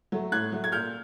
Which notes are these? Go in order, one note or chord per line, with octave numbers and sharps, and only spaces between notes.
F#3 A3
A2 F#6 G#6
F#3 A3
G#6
A#2 F6 G6